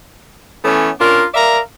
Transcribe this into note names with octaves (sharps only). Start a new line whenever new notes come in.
E3 A3 B3 C#4
C#4 D4 F4 A#4
A#4 D5 E5 F5 A#5